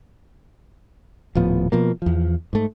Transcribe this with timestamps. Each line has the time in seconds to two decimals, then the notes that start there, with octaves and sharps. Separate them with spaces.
1.35 D#1 A2 F3 B3
1.72 B2 F3 A#3
2.02 E2 F3
2.53 G#2 A3